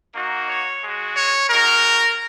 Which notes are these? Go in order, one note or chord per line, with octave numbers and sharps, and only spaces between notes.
A#3 D#4 F#4
C#5
G#3 F#4
C#5
G#3 D#4 F#4 A#4